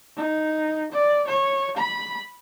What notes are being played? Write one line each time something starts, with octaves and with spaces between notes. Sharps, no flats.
D#4
D5
C#5
B5